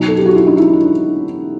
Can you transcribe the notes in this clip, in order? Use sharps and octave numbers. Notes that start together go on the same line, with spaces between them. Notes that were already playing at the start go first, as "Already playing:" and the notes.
Already playing: B2 F#3 D#4
A4
G4
F#4
E4
D#4
E4
D#4